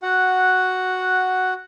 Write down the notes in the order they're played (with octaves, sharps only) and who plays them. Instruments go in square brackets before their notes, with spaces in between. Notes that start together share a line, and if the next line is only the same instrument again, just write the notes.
[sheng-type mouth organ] F#4 F#5